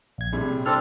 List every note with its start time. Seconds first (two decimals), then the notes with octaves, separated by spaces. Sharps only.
0.18 A#1 G#6
0.33 A2 C3 G3 G#4
0.66 C4 D4 A4 F6 A6